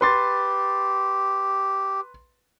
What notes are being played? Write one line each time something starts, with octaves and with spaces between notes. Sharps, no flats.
G4 B4 C6 A6